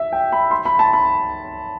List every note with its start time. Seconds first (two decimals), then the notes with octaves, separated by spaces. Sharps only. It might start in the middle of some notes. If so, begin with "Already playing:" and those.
Already playing: E5
0.12 G5
0.32 B5
0.51 C6
0.65 B5
0.79 A5
0.93 B5